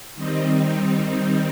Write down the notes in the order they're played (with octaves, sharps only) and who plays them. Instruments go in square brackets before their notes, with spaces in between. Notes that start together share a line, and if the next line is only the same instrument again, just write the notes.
[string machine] D#3 G3 C4 D#4